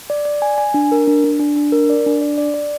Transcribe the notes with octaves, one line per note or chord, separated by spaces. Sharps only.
D5
D5
G#5
G#5
D4
A#4
D4
D4
D4
D4
A#4
D5
D4
D5
D5
D5